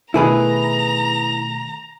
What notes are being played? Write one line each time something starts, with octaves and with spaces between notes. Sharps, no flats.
B2 D#3 A3 E4 G#4 B4 A#5